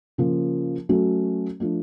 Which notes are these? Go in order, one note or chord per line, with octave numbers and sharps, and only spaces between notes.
C#3 F3 A#3
F#3 A3 C#4 F#4
F3 A3 D4